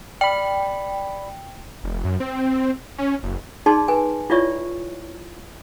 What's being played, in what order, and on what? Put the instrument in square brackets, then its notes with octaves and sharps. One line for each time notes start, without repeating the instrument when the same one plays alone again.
[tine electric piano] D5 B5 [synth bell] G5
[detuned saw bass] F1
F#2
C4
C#4
F#1
[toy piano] D#4 G#4 D5 A5 C6
B4 G#5
E4 F4 C#5 D5 E5 C#6